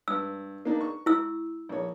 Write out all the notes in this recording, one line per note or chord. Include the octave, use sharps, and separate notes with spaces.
G2 E6
A#3 D4 D#4
C#6
E4 E6
A#1 C#5